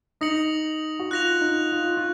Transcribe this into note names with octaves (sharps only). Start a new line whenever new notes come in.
D#4 D#6 A#6 C#7 F#7
F#4
F4 F#6 A#6 F7
D#4
F4
F4